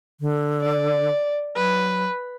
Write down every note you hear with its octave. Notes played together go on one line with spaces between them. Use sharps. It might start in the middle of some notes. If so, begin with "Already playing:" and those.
D3
D5
F#3 B4